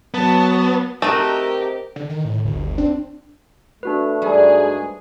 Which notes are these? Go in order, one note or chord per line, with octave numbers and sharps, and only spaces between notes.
F#3 B3 A5
A3 C4 D#4 F#4 G4 A#4 D#5
D3
D#3
A2
G1 D2
C4 D4
A3 D4 F#4 B4
G#2 G3 G#4